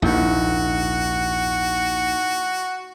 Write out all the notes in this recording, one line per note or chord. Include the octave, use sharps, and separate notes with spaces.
A#1 D#2 G#2 A#3 D#4 E4 F#4